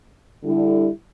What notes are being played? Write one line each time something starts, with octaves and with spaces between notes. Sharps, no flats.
D3 G3 E4